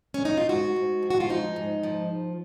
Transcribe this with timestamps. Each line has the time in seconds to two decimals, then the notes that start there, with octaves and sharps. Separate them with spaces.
0.14 C#4
0.25 D#4
0.37 F4
0.49 G#2 F#4
0.76 G#2
1.03 F3
1.10 F#4
1.20 F4
1.30 G#2 D#4
1.56 G#2
1.83 F3